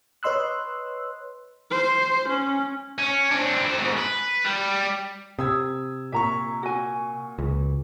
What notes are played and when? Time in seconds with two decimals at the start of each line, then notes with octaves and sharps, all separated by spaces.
0.23 B4 C#5 D#5 C6 E6 F#6
1.71 C5
2.28 C#4
2.98 C#4
3.31 C4 D4
3.62 F2 C5
3.77 G#2 B2
3.97 B4
4.44 G3
5.39 C3 D#6 E6 G#6
6.12 A#2 E5 A#5 C#6
6.63 F#4 G#5
7.39 C#2